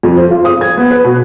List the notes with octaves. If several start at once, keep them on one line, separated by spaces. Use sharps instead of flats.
F2
C5
F4
D#6
G#6
B3
B4
B2